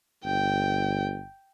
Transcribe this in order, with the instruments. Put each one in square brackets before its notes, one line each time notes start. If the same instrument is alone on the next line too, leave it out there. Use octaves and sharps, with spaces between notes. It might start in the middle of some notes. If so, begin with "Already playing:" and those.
[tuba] G1 [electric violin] G5